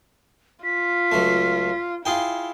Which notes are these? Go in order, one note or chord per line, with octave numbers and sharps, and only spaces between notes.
F4 B6
C#2 F#3 A3
E4 F4 G#4 G5